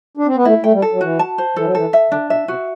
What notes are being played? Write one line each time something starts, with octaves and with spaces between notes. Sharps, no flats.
D4
C4
B3
A3 E4
A3 G5
G3
A4
F#3
E3 F#4
A5
C5
E3 A4
F#3
E3 A4
E5
D3 D4
B2 E5
C3 F#4